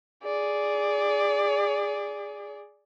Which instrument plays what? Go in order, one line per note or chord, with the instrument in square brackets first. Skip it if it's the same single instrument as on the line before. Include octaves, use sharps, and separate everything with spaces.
[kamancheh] G#4 D5